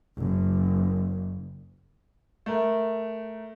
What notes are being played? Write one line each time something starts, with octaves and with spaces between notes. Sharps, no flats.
F#1
A3 A#4